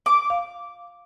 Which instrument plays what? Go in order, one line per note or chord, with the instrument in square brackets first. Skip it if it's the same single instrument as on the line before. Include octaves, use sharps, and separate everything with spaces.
[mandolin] D6
[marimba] F5